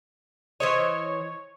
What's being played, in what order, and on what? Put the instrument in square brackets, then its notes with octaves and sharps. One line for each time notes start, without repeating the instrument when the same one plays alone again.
[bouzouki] E3 C5 D#5 [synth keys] C#5